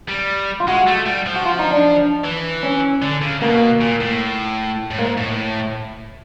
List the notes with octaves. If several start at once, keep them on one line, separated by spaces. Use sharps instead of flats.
G3
F4
G#3 F#4
A3
G3
F3
F#4
F4
D#4
D4
E3
C#4
D3
C#3
B2 A#3
A#2
A2
A2
G#2 A#3
A2